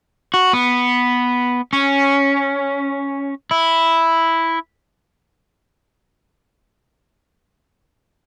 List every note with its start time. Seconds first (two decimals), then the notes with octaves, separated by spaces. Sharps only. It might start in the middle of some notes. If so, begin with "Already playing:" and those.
0.34 F#4
0.53 B3
1.73 C#4
3.51 E4